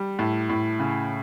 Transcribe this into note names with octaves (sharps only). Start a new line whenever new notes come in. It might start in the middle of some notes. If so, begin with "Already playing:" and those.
Already playing: G3
A2
A2
C#3